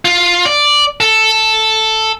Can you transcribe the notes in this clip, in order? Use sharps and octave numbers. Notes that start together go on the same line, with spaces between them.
F4
D5
A4